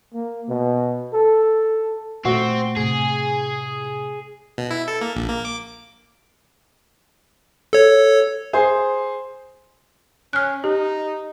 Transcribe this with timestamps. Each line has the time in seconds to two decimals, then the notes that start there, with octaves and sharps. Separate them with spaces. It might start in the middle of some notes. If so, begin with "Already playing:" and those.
0.14 A#3
0.49 B2
1.14 A4
2.25 A#2 A3 C4 F#4
2.77 A2 C3 G#4
4.58 B2
4.71 E4
4.88 A4
5.01 A#3
5.16 A#1
5.29 A#3
5.45 D6
7.73 A4 C#5
8.53 G#4 C5
10.33 C#4 F6 F#6
10.64 D#4 G4